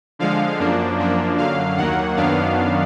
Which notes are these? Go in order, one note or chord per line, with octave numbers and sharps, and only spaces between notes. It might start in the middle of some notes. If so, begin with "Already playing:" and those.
D3 F3 G#3 F5
F#2 F3 A#3 D4
F#2 F3 A#3 D4
F#2 D3 F#3 F5
D#2 D#3 F#3 A#3 F#5
F#2 D#3 F#3 B3 D4 F5